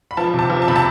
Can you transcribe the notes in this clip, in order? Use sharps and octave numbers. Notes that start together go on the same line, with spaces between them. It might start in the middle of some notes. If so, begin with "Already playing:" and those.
B5
F3 A5
C3
A5
F3
A5
C3 B5
A5